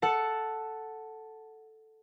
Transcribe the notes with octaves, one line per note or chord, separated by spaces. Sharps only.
A4 F#5 A5